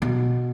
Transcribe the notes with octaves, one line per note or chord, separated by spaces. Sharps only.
B2